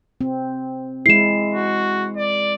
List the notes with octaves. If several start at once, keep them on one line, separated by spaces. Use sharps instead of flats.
C4
G#3 E4 C7 E7
F#4
D5